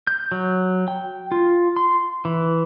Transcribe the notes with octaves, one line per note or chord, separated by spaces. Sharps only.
G6
F#3
G5
F4
C6
E3